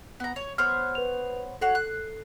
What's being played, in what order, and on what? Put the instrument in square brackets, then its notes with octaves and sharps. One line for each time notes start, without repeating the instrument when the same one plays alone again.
[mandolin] B3 A#5
C#5
[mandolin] B3 C5 C#5 [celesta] F6
[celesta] B4 F7
[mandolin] F#4 C#5 F#5 [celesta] A4 C7
[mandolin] F#6